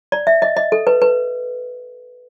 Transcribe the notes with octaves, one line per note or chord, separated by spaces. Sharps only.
D5
E5
D#5
D#5
A4
B4
B4